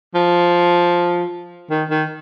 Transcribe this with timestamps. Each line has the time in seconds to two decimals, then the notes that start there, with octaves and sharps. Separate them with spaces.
0.15 F3
1.71 D#3
1.90 D#3